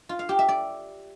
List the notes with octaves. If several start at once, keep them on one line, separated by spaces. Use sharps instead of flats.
F4
F5
G4
E5
D5